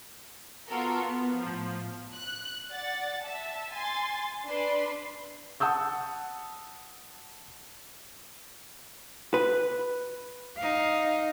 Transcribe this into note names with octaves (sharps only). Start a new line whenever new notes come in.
B3 F4 F#4 A4 A#4
B3
A2 F3
F#6
D5 F#5 A6
E5 A5
G#5 C6 A6
D4 B4 C6
F#5 A5 D#6 E6 G6
B4
D#4 F5